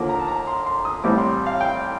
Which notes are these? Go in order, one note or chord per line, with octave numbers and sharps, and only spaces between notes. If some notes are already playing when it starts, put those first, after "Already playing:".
Already playing: D#2 D3 F3 A#3 D6
A#5
A5
A#5
C6
C6
D#6
A1 A2 G3 C4 D6
C6
F5
G5